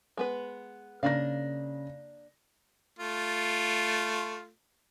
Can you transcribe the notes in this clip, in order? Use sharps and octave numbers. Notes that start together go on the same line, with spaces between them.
G#3 B3 B4
C#3 A#3 D4 F5 A#6
A3 F4